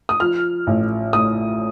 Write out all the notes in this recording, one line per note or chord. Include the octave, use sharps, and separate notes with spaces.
D#6
F3 F6
A1
A2 D#6